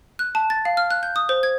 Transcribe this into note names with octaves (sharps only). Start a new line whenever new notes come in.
F#6
A5
A6
F5
F6
F#6
G6
D#6
C5
G#6